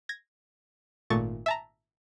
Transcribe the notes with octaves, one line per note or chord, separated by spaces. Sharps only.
G#6 A#6
G#1 A#2 A3 C#6 A6
E5 A5 A#5